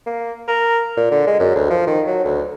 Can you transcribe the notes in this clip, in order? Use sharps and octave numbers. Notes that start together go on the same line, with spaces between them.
A#3
A#4
A#2
D3
G#3
F#2
D2
F3
D#3
F#3
D2